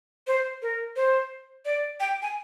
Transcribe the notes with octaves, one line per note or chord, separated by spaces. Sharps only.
C5
A#4
C5
D5
G5
G#5